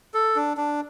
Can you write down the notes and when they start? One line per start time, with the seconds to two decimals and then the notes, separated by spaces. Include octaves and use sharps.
0.14 A4
0.36 D4
0.57 D4